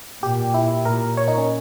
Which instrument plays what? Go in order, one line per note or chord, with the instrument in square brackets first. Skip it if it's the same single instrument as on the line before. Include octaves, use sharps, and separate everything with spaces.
[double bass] A#2 [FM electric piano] G4
[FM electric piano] E4
[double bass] A#2 [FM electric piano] A#4
[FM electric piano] C#5
D#4
C#4